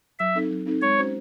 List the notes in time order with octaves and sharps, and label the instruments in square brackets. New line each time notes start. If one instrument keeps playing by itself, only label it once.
[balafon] F#3 [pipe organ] E5
[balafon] C4 D#4 A4
F#3
C4 D#4 A4
[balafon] G#3 [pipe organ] C#5
[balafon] C#4 F#4 C5